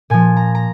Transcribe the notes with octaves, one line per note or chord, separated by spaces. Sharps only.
A#2 F3 G#5
A#5
A#5